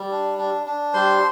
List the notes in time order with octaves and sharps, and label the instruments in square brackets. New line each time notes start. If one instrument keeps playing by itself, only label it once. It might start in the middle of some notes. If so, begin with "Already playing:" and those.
Already playing: [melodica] G3
D4
D4
D4
G3 C5 C6